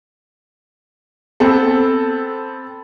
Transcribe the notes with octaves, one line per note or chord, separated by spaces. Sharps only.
B3 C4 A4